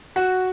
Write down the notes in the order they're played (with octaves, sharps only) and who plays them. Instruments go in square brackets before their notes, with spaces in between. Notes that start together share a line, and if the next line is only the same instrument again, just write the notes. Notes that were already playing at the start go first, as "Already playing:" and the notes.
[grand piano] F#4